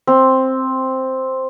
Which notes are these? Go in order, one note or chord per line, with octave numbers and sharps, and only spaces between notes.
C4